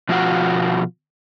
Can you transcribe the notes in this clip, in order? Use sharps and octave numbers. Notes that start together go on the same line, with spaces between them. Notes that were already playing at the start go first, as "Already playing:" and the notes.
B2 F3 F4 F#4 F5 F#5